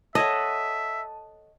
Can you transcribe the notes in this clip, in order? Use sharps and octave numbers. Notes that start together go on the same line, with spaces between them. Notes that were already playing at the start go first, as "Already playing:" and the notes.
A4 C#5 D#5 E5 F#5 A5